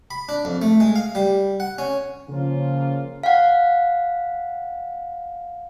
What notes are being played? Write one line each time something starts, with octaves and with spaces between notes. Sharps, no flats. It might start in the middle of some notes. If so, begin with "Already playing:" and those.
B5
D4
F2
A3
G#3
F5
G3
F#5
C#4
C#3 F3 A#3 C#4 F4
F5 F#5